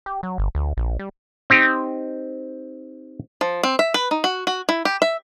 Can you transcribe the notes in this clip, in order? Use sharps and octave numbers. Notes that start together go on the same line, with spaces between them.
G4
F#3
G1
D2
A#1
G3
C4 D#4 G4
F3
C4
E5
B4
D#4
F#4
F#4
E4
G4
E5